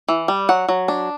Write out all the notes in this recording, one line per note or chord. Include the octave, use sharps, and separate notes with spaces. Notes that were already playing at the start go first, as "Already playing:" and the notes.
E3
G3
F#3 F#5
F#3
D4